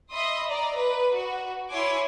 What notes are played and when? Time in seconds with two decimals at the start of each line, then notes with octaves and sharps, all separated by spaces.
0.12 D#5 E5 B5 C6 D#6
0.47 D5 A#5
0.75 B4
1.14 F#4
1.70 E4 C#5 G#5 C6 D6